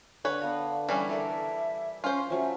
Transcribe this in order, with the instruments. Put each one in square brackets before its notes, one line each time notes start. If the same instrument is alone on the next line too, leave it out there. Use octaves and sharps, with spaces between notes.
[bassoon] D3 [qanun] D4 [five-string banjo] B4 C#5
[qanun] B3 A#5 [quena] F5
[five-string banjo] E3 G3 C#4
[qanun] A4 A#4 D5 [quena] E5
[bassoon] C#4 [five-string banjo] F4 C5
[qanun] F3 F#3 A3 [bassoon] C#4 [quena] E5